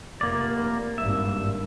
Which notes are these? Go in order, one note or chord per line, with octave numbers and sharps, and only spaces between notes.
F1 A#3 D5
G#1 G2 A#3 E5